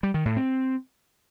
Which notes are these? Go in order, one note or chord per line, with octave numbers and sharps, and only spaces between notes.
G3
D#3
A2
C4